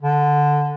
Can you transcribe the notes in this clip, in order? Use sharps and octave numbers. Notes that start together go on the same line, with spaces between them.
D3